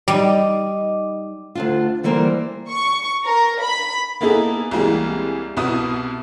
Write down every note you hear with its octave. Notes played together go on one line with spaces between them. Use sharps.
G3 D#4 D#5 D6
D2 D4 F4
D3 E3 G3 A#3 A#4 C5
C#6
A#4
B5
A#3 B3 D#4 E4 G#4 A4
C2 E3 G3 G#3 A#3
C2 B2 B3 E4 A5 D#6